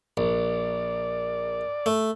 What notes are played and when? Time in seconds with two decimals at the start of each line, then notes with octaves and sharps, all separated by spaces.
0.17 A#1 D5
1.86 A3